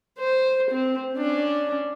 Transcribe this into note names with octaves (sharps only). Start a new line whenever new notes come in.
C5
C4
C#4 D4